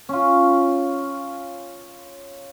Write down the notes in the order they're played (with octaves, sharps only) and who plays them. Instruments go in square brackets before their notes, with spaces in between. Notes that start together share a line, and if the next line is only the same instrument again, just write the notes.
[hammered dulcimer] C#4 F4